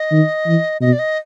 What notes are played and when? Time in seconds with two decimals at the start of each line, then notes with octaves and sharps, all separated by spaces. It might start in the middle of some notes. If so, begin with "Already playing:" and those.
Already playing: D#5
0.11 D#3
0.47 E3
0.81 B2 D#5
0.93 D5
0.99 D#5